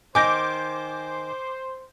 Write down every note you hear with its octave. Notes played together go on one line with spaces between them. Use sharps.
D#3 C5 G#5 D6 G6 A#6